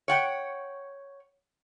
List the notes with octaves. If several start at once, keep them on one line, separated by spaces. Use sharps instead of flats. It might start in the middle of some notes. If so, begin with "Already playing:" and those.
C#5 F#5 G5